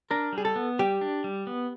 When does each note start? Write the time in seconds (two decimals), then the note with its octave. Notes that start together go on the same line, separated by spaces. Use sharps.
0.11 D4 A#4
0.33 G3 G#4
0.45 A4
0.56 B3
0.79 G3 G4
1.01 D4
1.24 G3
1.47 B3